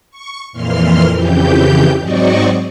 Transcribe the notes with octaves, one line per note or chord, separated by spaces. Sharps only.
C#6
F2 A#2 E3 C6 F6
F2 C#3 E3 G4 G6
G#2 F#3 C4 D5 D#5 C#6